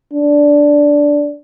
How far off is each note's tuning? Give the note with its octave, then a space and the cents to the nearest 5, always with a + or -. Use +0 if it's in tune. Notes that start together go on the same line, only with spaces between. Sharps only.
D4 -10